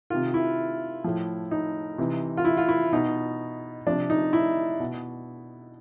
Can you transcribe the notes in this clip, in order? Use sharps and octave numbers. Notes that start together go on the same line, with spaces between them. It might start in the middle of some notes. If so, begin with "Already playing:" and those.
C3 D#3 F4
E4
A2 F3
D#4
C3 E3
F4
E4
F4
E4
B2 D#4
C3 F3 D4
D#4
E4
B2